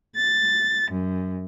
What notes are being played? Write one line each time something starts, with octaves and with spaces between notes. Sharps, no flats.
A6
F#2